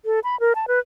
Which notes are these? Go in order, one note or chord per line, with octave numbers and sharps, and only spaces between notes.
A4
B5
A#4
A5
B4